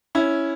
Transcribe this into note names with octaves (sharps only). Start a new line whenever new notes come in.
C#4 E4